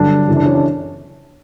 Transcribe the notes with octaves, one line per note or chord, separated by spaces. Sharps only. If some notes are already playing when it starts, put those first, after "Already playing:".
Already playing: G2 D3 F#3 D4
F#2 C#3 E3
D4
C#4
D4